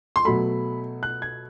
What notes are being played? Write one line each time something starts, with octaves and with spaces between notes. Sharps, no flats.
C6
B2 F#3 A3 B5
F#6
G#6